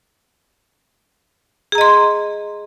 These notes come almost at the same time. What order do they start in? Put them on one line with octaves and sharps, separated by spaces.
G#4 A#5 D#5 C6